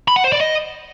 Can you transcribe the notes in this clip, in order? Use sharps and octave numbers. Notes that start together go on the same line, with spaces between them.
B5
F#5
C5
D5
D#5